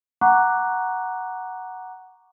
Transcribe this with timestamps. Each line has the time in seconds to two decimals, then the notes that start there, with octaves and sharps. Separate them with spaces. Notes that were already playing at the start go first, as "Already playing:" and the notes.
0.21 F#5 A#5 C#6 D6 F#6